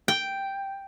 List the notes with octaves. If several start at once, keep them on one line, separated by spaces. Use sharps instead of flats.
G5